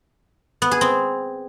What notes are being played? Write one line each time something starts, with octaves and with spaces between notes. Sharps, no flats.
B3
G#4
C4